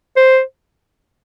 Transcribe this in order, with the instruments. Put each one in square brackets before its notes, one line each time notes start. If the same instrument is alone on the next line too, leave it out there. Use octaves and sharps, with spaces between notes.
[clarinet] C5